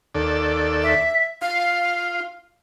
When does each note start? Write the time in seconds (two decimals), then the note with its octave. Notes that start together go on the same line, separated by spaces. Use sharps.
0.15 D#2 A4 D5
0.83 E5
1.42 F4 F5